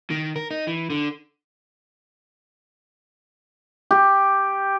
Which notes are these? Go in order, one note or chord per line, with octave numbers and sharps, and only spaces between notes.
D#3
A#4
D#4
E3
D3
G4